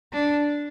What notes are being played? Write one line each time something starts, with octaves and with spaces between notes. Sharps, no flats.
D4